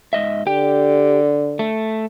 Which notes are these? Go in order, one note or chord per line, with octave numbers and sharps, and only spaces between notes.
G#2 D#5 E5
D3 G4 G5
A3